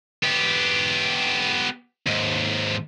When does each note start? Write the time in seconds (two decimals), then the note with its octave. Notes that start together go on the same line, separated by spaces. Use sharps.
0.24 B3 G4
2.07 D#2 G#2